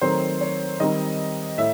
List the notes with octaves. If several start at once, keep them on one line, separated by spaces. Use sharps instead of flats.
D#3 F#3 A3 C4 D#4 C5
C#5
D#3 G3 C4 D#4 D#5
A2 E5